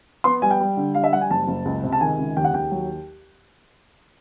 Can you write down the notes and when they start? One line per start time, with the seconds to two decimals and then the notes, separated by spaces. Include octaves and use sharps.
0.24 B3 C6
0.42 G3 G#5
0.51 G5
0.60 G3
0.77 D3
0.95 G3 F5
1.04 E5
1.13 G3 F#5
1.21 G#5
1.30 F#1 A5
1.48 F#1
1.65 C#2
1.83 C3
1.93 A5
2.01 D#3 G#5
2.18 C#2
2.37 D#2 G5
2.44 F#5
2.53 D#2 G5
2.71 F#3